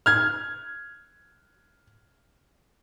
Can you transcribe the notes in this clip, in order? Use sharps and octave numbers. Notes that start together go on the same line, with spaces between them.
F6 G#6